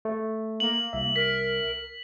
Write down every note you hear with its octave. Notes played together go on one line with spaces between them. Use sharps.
A3
A#3 F#7
C2 E5
A#4 B6